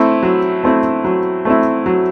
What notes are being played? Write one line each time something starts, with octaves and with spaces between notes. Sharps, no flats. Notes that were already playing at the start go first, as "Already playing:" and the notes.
Already playing: A3 C4 E4
F#3
A3 C4 E4
F#3
A3 C4 E4
F#3